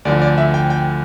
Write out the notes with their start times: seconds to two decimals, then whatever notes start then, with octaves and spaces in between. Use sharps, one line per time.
0.05 D2 D3 F3 D5
0.22 D5
0.38 E5
0.54 G5
0.70 G5